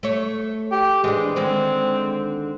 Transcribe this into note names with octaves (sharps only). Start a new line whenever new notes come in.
A3 C#5
G4
E3 G#3 C4 D4
D3 D#3 G#3 C4